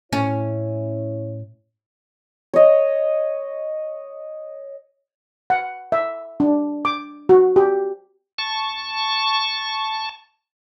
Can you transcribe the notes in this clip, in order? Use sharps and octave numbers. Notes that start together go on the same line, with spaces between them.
A2 C#4 E4 C#5
C#5 D#5
F#5
E5
D4
D6
F#4
G4
A5 C#6